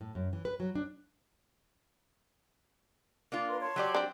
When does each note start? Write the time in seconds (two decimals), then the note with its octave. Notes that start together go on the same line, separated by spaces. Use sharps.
0.01 A2
0.15 F#2
0.33 E3
0.45 B4
0.60 F#3
0.75 D4
3.32 A#3 D4 F4
3.48 A#4 B4 C6
3.60 C#5 A5 C6
3.76 F#3 G4 D5
3.95 C4 D4